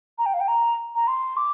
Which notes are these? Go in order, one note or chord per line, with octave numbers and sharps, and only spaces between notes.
A#5
G5
F5
G5
A#5
A#5
C6
D6